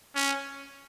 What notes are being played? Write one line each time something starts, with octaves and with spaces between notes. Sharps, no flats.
C#4